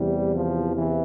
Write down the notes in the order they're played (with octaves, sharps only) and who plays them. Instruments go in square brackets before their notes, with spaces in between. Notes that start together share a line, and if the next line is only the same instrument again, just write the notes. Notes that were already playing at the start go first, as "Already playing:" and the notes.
Already playing: [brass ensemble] E2 C3 E3 G3
F3
E3